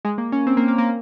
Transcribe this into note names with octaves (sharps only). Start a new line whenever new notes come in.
G#3
A#3
C#4
C4
A#3
A#3
A#3